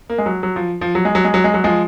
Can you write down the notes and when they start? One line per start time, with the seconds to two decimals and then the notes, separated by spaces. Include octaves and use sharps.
0.10 A#3
0.18 G#3
0.26 F#3
0.43 F#3
0.56 F3
0.81 F3
0.95 F#3
1.05 G#3
1.15 F#3
1.24 G#3
1.34 F#3
1.44 G#3
1.54 F#3
1.64 F3 G#3